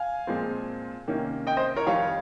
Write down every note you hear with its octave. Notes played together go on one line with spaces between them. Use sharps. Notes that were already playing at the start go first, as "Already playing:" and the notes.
Already playing: F5 G#5
A#2 F3 G#3 C4
C3 D#3 A#3 C#4
D#5 G5
C5 D#5
A#4 C#5
F2 D#3 G3 C#5 F5